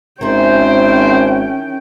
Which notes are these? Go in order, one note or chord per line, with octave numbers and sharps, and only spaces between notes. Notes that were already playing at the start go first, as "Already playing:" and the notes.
G#1 D#3 C#4 E4 G#4 C5 G5